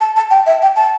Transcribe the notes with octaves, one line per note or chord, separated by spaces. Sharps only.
A5
A5
G5
E5
G5
A5